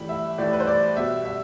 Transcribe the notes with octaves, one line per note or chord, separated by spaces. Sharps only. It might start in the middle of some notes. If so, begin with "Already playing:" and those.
Already playing: A2 E3 G3 B5
E5
A2 E3 G3 D5
B4
C5
D5
B2 G3 E5
E5